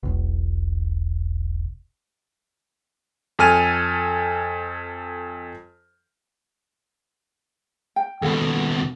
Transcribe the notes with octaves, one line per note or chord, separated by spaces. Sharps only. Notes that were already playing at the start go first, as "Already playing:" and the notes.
E1 B1
F2 A4 G#5 F6 D#7
G5
D#2 B2 A4 F#5 B5